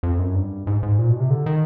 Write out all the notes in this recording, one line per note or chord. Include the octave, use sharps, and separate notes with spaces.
F2
F#2
G2
G#2
G#2
A#2
B2
C3
D3
D#3